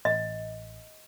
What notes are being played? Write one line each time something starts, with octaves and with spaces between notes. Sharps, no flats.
A1 D#5